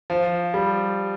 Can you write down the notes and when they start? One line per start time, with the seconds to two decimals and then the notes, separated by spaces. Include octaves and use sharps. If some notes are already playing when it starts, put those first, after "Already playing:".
0.10 F3
0.54 G3